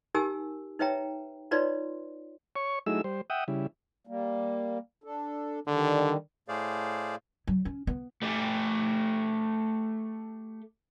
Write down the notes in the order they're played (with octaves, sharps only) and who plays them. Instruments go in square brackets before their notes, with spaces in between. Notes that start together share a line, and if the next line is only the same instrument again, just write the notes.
[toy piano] D#4 G4 A#4 G#5 E6
D#4 B4 C#5 E5 G5 A#5
D#4 F4 B4 C#5 D5 C6
[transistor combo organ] C#5 C#6
F#3 A3 D#4 E4 G#4 E6
G3 C5
E5 F#5 G5 D#6
C#3 G3 E4
[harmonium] G3 A#3
D4 A4
[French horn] D3 [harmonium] D#3 G3
[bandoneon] A2 A3 G#4 C5 D5 F5
[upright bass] F#3
C#4
B3
[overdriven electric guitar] A3 G4